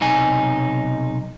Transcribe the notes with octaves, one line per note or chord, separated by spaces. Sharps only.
B1 C3 D#4 G#5